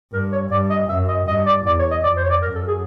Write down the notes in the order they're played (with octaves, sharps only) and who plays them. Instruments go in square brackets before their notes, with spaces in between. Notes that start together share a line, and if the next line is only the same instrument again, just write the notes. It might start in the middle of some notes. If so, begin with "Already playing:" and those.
[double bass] G2 [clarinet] A#4
[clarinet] C#5
[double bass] G2 [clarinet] D5
[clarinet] D#5
[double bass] F#2 [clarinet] E5
[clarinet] D#5
[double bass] G2 [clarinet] D#5
[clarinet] D5
[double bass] E2 [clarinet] D5
[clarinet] C#5
D#5
[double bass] F2 [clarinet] D5
[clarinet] C5
C#5
D5
[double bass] F#2 [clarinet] A#4
[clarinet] A4
G#4